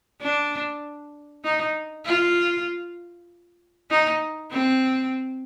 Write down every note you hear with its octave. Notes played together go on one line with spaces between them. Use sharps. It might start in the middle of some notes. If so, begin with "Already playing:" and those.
D4
D#4
F4
D#4
C4